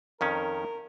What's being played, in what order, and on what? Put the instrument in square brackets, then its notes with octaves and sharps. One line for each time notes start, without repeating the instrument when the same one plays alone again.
[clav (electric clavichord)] F2 D#3 C#4 [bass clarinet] A#4